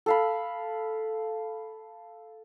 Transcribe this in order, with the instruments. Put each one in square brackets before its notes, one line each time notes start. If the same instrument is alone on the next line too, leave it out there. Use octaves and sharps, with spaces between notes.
[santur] A4 F5 B5